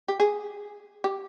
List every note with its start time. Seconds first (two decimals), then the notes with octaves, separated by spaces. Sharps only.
0.08 G4
0.20 G#4
1.04 G4